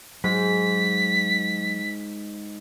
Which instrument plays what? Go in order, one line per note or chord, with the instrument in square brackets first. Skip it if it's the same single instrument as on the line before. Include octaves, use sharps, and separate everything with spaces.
[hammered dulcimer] G#2 [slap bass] F#3 [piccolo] B6